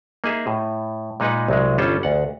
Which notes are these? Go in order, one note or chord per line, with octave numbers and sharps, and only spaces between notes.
A#3 D#4 G#4 E5
A2
A#2 G#3 D#4 B4 F#5
C2 F#3 G#3
G1 G3 C#4 F4 A4
D2 F#5